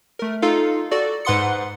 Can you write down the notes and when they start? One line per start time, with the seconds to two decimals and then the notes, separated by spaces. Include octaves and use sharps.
0.19 A3 A#4
0.42 D#4 F4 A4 F5
0.91 F#4 A4 D5
1.25 G#2 B4 F#5 C6 D#6 C#7